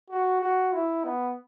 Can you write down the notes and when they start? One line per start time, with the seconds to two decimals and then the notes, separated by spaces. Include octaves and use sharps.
0.10 F#4
0.41 F#4
0.73 E4
1.04 B3